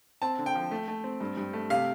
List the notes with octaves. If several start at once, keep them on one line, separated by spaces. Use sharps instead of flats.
C4 A5
D3
G5
F3
A3
A3
C4
G2
G2
A3
C3 F5